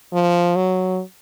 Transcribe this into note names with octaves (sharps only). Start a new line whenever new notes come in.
F3
F#3